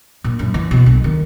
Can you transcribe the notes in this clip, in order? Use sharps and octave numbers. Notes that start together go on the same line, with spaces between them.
A#2
F#2
E3
B2
B1
D#3